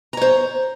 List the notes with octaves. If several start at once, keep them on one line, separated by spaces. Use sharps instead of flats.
C5 C#5 A#5